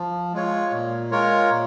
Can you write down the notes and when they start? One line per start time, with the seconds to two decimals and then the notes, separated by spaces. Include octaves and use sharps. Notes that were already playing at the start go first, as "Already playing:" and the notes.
Already playing: F3
0.33 G#3 F4 C#5
0.72 A#2
1.11 G#3 F4 A#4 C#5
1.50 A#2